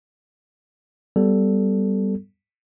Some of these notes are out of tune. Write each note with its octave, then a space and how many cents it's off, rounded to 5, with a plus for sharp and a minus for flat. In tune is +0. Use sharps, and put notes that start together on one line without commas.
G3 -5 B3 +0 A4 +0